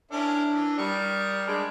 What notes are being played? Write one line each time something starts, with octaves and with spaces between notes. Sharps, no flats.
C#4 D4 E4 A#4
E3
G3 A#4 C#6 D#6
G#3 D4